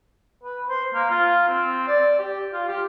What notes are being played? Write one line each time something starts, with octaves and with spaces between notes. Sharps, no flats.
B4
C5
A#3
F4
C4
D5
G4
F4
G4